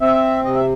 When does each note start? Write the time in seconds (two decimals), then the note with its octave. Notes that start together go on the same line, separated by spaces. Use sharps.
0.01 C4 E5
0.45 C3 D#5
0.55 E5